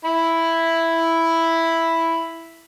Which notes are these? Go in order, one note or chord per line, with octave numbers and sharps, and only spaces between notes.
E4 B5